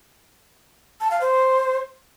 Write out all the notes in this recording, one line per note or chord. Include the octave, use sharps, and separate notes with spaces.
A5
F5
C5